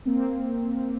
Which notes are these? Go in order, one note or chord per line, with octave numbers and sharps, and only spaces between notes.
A#3 C4